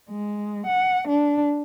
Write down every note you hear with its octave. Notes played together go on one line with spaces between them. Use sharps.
G#3
F#5
D4